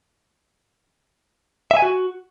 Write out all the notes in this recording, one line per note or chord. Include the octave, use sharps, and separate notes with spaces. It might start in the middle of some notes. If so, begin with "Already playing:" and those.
E5
G#5
F#4